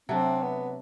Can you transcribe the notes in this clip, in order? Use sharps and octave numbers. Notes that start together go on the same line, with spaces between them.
C3 F#3 A3 C4 D4
B3